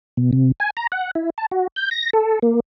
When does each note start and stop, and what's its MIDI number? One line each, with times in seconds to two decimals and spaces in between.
0.17 0.31 47
0.33 0.52 48
0.60 0.70 80
0.77 0.87 82
0.92 1.11 78
1.15 1.30 64
1.38 1.46 81
1.51 1.67 66
1.76 1.90 91
1.91 2.10 94
2.13 2.39 69
2.42 2.60 58